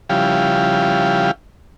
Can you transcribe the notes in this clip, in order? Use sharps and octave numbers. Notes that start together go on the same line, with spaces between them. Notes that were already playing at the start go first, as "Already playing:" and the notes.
C#3 F3 G3 E4 G4 F5